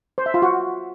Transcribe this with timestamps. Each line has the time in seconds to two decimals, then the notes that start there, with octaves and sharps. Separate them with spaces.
0.18 C5
0.26 E5
0.34 F4
0.42 F#4